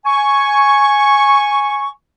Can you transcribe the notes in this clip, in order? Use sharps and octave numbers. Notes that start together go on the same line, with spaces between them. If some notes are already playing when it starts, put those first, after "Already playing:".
G#5 C#6